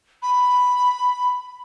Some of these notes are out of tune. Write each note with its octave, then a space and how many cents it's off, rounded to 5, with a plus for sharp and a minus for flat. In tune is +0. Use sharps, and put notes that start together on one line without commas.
B5 +0